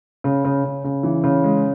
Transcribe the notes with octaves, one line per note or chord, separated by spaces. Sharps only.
C#3
C#3
C#3
C#3
E3
C#3
G#3